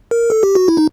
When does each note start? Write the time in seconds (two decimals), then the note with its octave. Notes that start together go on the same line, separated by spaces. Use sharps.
0.11 A#4
0.30 A4
0.43 G4
0.55 F#4
0.68 E4
0.77 D#4